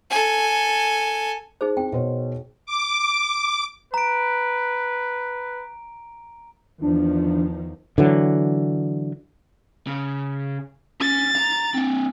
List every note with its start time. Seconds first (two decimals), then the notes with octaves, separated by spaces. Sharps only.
0.10 A4 G#5
1.61 D#4 G#4 C5
1.77 C4 G5
1.93 B2 C5 C#5
2.66 D6
3.94 B4 A#5 D7
6.82 E2 D#3 F3 D4
7.98 D3 E3 F#3
9.87 C#3
11.01 C#4 A6
11.35 A#5
11.74 C4 D4